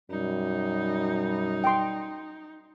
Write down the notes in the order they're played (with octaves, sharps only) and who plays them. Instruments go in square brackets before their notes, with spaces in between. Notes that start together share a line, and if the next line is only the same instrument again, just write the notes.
[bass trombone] F#2 [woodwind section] B2 G3 [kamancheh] D#4
[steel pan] G5 C6